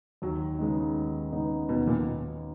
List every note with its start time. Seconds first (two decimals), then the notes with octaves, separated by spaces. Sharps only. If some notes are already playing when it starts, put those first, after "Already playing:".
0.22 D#2 F#3
0.59 C#3 G#3 B3 D#4
0.95 D#2
1.32 C#3 G#3 B3 D#4
1.69 D#2 B2
1.87 A#2